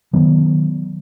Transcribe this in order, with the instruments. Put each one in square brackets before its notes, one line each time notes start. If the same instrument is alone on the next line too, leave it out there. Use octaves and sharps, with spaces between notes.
[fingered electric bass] D#3 F#3 B3